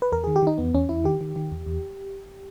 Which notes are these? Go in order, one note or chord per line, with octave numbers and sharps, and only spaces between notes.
B4
E2 A#4
D#3 G#4
G4
D#3 D#4
E2 B3
E2 C#4
E2 E4
D#3 G4
D#3
D#3
E2
E2